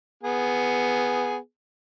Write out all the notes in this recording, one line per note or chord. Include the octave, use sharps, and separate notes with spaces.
B3 G#4